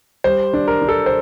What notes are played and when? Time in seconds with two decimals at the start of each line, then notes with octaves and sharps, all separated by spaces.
0.24 G3 C5
0.53 D4
0.67 A#4
0.82 D4
0.89 A4
1.06 C5